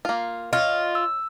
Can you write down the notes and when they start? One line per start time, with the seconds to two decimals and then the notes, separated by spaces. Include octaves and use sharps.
0.05 A#3 F4
0.53 F4 C#5 D#5
0.95 E6